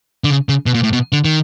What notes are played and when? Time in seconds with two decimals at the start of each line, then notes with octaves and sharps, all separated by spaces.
0.24 D3
0.30 C#3
0.49 C#3
0.66 B2
0.74 A#2
0.83 A2
0.93 B2
1.13 D3
1.25 D#3